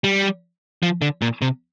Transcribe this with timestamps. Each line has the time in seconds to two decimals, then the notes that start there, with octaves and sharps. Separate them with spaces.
0.04 G3
0.83 F3
1.02 D3
1.22 A#2
1.42 C3